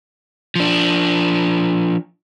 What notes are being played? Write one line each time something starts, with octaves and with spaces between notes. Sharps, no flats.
F3 D4